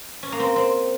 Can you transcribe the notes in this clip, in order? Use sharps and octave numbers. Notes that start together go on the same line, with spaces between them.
C#4
A#3
C4
C4